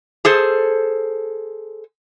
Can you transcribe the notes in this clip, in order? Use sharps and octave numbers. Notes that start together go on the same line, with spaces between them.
G#4 A4 C5